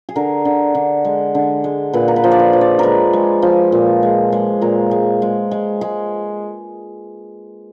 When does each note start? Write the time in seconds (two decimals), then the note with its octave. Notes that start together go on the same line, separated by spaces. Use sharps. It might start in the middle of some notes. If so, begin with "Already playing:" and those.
0.09 G#4
0.16 D3 A#4
0.45 D3
0.75 D3
1.05 G#3
1.35 D3
1.64 G#3
1.93 A#2 B4
2.08 A#4
2.16 B4
2.24 F3
2.31 D5
2.39 B4
2.53 F3
2.61 D5
2.79 G#3 A#4 B4
3.13 G#3
3.42 F3
3.72 A#2
4.03 G#3
4.32 G#3
4.61 A#2 A#4
4.91 G#3
5.22 G#3
5.51 G#3
5.81 G#3